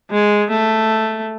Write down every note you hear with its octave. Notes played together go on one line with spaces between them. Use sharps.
G#3
A3